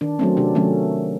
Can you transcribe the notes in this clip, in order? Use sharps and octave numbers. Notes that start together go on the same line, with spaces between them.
D#3 D4
F#3 A3 C4 C#4
C3 D4
D#3 F#3 A3 C#4